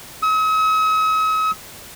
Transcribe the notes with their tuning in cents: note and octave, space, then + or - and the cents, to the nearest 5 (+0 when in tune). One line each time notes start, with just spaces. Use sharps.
D#6 +45